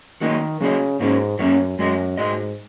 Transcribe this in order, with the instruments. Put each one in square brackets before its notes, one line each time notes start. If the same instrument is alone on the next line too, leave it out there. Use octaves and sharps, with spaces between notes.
[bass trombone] D#3 [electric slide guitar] F#3 A#3 F#4 D#5
[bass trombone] C#3 [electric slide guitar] F#3 A#3 F#4 D#5
[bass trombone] G#2 [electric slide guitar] F#3 A#3 C#4 A#4
[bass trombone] F#2 [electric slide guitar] F#3 A#3 C#4 A#4
[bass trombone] F#2 [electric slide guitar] G#3 F#4 D#5
[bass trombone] G#2 [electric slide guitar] G#3 F#4 D#5